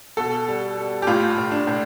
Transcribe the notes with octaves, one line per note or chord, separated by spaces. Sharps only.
B2 A4
G3
G3
G4
A2 F4
A2
D4
A2